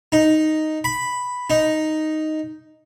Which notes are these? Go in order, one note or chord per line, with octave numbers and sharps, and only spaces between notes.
D#4
B5
D#4